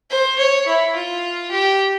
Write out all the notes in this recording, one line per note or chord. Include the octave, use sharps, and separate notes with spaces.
C5
C#5
E4
F4
G4